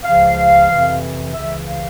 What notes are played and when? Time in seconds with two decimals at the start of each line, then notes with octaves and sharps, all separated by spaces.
0.04 C#2 C#3 F3 F5
0.69 F2 C3 E3
1.34 C#2 C#3 E3 E5
1.67 F5